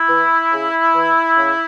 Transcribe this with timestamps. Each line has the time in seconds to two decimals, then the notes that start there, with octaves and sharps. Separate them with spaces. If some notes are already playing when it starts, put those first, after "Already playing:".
Already playing: E4
0.09 E3
0.52 C#3
0.95 E3
1.37 C#3